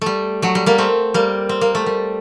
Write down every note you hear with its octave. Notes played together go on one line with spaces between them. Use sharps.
G3 A3
F#3 A3
G3
G3 A#3
A3 C4
G3 A#3
C4
A#3
A3
G3